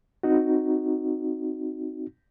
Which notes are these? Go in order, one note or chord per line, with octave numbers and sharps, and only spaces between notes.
C4 D#4 F#4